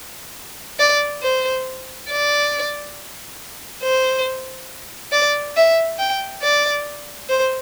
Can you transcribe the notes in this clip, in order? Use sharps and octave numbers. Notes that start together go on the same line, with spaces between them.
D5
C5
D5
C5
D5
E5
G5
D5
C5